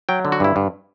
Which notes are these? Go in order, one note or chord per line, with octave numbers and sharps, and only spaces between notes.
F#3 G5
D3
F#4
G2 E4
G2